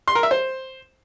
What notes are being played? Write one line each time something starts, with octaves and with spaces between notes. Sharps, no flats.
C6
A#4
E5
C5